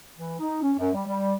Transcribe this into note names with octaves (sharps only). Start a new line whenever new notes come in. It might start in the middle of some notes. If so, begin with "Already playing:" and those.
E3
D#4
C#4
F#2
G3
G3